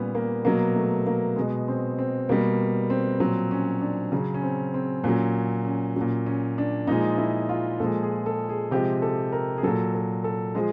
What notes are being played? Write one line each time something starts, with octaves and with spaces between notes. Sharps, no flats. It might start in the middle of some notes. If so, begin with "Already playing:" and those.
Already playing: A#2 G3 B3 C#4
A#3
B2 F#3 A#3
A3
A#3
B2 G#3
C4
C4
B2 G3 A#3
C4
A#2 F#3 C4
C#4
D4
C#3 F#3 C#4
C#4
C4
C4
A#2 F#3 C#4
C#4
A#2 F#3 C#4
C#4
D4
A#2 F3 G#3 D#4
E4
F4
A#2 F3 G#3 A4
G#4
A4
G#4
C3 F3 G#3 G4
A4
A#4
G#4
A#2 F#3 A4
A4
A4
F3 G#3 G#4